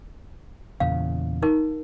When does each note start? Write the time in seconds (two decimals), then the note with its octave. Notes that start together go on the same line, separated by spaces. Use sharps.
0.80 E2 A#2 C#3 F5
1.42 D#4 A#4